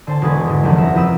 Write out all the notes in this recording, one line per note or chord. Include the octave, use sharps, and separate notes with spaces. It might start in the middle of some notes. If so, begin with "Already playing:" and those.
D3 C5 A5
E1 D#4 F#4 B4 D#6 G#6
G#2 D3 E3
F#1 E2 C3 F3 F#5
E5 A#5
F3 C4 B4 D#6 E6 E7